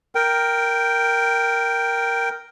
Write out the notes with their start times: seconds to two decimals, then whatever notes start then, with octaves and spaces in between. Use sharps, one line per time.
0.15 A#4 G5